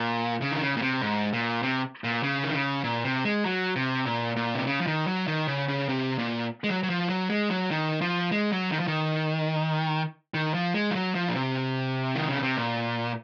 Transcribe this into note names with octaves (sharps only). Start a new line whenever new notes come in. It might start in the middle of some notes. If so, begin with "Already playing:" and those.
Already playing: A#2
C#3
D#3
C#3
A#2
C3
G#2
A#2
C3
A#2
C#3
D#3
C#3
A#2
C3
G#3
F#3
C3
A#2
A#2
C3
C#3
F3
D#3
F#3
D#3
C#3
C#3
C3
A#2
G#3
F#3
F#3
F3
F#3
G#3
F#3
D#3
F3
G#3
F#3
D#3
F3
D#3
D#3
F3
G#3
F3
F#3
F3
A#2
C3
D#3
C#3
C3
A#2